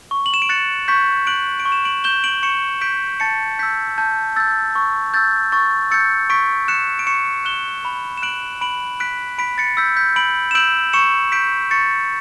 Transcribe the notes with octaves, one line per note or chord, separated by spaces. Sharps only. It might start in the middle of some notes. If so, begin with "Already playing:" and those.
C#6
F#7
E7
D7
F#6 A6 C#7
C#6 G6 B6
F#6 D7 F#7
D7
C#6
E7
D7 F#7
G6 E7 G7
D7 F#7
C#6 C#7 E7
G6 B6 D7
A5 A6 C#7
E6 G6 B6
A5 G6
E6 G6 A6
C#6
E6 G6 A6
C#6 A6
E6 G6 A6 C#7
C#6 B6 D7
F#6 C#7 E7
D7
C#6 C#7 E7
F#6 E7 G7
B5
E7
F#6 D7 F#7
B5 D7 F#7
F#6 B6 D7
B5 B6 D7
A6 C#7
E6 G6 B6
G6 B6
B5 D7 F#7
E7
E6 G6 D7 F#7
C#6 C#7 E7
G6 B6 D7
C#6 A6 C#7